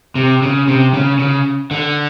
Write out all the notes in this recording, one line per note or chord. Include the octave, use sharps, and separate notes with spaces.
C3
C#3
C3
C#3
C#3
D3